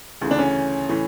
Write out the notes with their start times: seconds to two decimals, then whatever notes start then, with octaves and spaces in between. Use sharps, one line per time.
0.21 D2 C#3 E3
0.31 D4
0.39 C#4
0.89 A2 E3